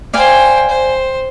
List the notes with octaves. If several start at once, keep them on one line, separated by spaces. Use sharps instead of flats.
C5 D5 F5 G5 G#5
C5